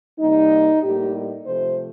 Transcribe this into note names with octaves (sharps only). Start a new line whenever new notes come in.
C3 G3 A#3 D#4
A2 G3 A#3 G4
C3 F3 A3 C5